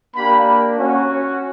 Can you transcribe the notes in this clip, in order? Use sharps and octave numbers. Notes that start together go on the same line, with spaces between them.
A#3 D4 G4 B5
C#4 F#4